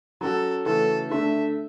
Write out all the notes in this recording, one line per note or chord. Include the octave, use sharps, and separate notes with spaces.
F#3 C#4 F#4 A4
C#3 E3 A3 C#4 F#4 A4
D3 A3 D4 E5